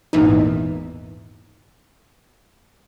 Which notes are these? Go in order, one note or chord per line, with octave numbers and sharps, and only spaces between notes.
G#1 E2 A#2 E3 D#4